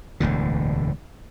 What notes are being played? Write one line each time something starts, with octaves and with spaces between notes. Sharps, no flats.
E1 D2 A2 D3